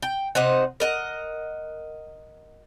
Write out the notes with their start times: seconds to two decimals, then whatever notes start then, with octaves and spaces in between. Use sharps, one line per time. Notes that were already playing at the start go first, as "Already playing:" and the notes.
0.03 G5
0.35 C3 D#4 C5 F#5
0.80 A#4 D#5 F#5